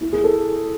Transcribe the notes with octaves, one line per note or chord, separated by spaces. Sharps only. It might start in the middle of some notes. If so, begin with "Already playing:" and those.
E4
G#4
A4